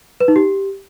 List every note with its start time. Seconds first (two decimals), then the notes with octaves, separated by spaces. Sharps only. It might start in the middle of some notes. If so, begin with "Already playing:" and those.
0.20 B4
0.28 D#4
0.36 G4